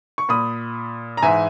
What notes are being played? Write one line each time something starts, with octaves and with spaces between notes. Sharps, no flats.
C#6
A#2 B5 D#6
A#5
G#2 E3 E5 G#5